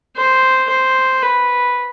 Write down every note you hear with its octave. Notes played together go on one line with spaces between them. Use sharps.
C5
C5
B4